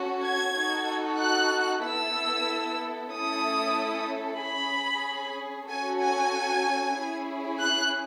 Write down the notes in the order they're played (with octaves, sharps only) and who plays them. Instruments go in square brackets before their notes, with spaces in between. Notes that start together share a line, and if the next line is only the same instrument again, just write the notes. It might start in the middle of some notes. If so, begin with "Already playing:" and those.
Already playing: [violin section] C#4 F#4 A4
G#6
D#4 F#4 A4
F#6
B3 E4 A4 E6
A3 C#4 E4 A4 D#6
C#4 G#4 B5
C#4 F#4 A4 G#5
G#5
C#4 E4 G#4
F#6